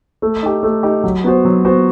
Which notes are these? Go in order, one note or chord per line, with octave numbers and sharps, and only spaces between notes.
A3
D#4 G4
A3
D#4 G4
F#3
B3 F#4 C5
F#3
B3 F#4 C5